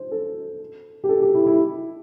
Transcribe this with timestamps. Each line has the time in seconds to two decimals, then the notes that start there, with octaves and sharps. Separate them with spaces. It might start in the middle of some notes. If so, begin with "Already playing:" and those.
Already playing: C5
0.11 A4
1.04 G4
1.09 A4
1.21 G4
1.35 E4
1.46 E4